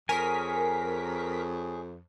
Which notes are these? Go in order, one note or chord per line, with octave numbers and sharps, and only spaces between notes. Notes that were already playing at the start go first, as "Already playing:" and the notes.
F2 G#4 A#4 C#5 G#5 B6